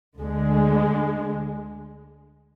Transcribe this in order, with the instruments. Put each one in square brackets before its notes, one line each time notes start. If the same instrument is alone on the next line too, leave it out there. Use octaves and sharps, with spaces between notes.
[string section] D2 D3 G#3